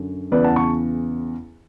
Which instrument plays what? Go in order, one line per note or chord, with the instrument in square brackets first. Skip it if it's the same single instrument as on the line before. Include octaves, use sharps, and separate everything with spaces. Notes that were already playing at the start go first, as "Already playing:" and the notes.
Already playing: [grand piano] F#2 D3 F#3
E2 C#3 E3 B4 D5
F#5 A5
A5 C#6